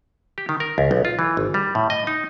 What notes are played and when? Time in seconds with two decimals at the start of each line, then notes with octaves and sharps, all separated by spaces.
0.38 G4
0.49 D#3
0.60 A#4
0.78 C#2
0.91 B1
1.05 F4
1.19 E3
1.37 G#1
1.54 G3
1.75 A2
1.90 D#5
2.07 D#4